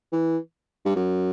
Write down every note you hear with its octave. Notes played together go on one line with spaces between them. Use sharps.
E3
G2
F#2